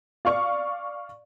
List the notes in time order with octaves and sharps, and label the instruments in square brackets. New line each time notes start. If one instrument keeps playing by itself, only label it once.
[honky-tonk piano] D5 F5 C#6